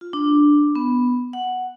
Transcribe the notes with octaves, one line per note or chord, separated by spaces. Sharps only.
F4
D4
B3
F#5